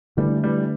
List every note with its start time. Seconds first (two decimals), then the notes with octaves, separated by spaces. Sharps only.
0.17 D3 E3 G3 A3 D4
0.44 E3 G3